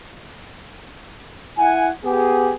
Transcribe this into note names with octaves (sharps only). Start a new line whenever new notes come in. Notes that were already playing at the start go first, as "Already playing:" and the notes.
E4 F#5 G#5
B3 G4 G#4